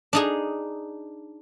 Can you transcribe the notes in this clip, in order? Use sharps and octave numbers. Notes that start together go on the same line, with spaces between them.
D4 D#4 G#4